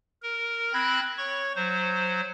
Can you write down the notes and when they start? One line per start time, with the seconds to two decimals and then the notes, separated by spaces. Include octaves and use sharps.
0.22 A#4
0.74 C4 B5 F#6 G#6 A#6
1.17 C#5 C#6
1.56 F#3 C5